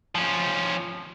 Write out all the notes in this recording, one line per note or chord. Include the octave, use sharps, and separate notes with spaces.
F3 C#4